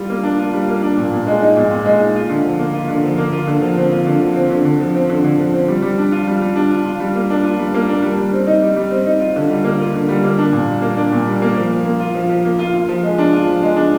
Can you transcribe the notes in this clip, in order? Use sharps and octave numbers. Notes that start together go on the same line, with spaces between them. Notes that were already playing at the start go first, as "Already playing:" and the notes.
Already playing: G3 F4
A#3
D4
F4
G3
A#3
D4
A#2
A#2
G#3
D#4
A#2
A#2
G#3
D#4
F4
D3
F3
A#3
F4
D3
F3
A#3
F4
D3
F3
C4
F4
D3
F3
C4
D3
D3
F3
C4
D3
D3
F3
C4
G3
G3
D4
F4
G3
G3
D4
F4
F4
G3
A#3
D4
F4
G3
A#3
D4
G3
G3
C4
D#4
G3
G3
C4
D#4
F4
D3
G3
A#3
F4
D3
G3
A#3
D4
A#2
G3
A#3
D4
A#2
G3
A#3
F3
F3
A#3
F4
F3
F3
A#3
F4
F4
F3
G#3
D4
F4
F3
G#3
D4